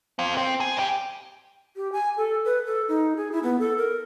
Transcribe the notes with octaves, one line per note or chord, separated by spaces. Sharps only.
C4 F4
C4
G#4
G2 G4
G4
G#5
A4
B4
A4
D#4
G#4
E4
B3
A4
A#4